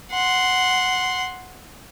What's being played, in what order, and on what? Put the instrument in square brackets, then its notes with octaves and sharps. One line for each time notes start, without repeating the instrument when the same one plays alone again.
[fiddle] F#5 C6